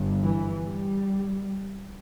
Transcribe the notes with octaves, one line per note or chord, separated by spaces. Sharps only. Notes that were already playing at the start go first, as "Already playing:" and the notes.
Already playing: G1 G2
E3
G3